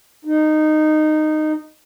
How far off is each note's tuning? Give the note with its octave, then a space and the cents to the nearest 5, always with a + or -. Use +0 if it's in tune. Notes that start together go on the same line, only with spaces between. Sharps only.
D#4 -15